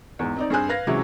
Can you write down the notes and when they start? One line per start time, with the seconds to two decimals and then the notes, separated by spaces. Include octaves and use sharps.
0.19 E2 G#2
0.37 C4 D#4 D5
0.50 G2 C4 G#4 C5 G#5 F#6
0.69 B4 F5 G#6 A#6
0.87 C3 E3 F#3 G#3 C#4 E4